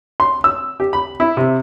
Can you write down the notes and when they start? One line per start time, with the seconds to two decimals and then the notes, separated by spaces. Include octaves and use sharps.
0.20 C6
0.44 E6
0.80 G4
0.93 B5
1.20 E4
1.37 C3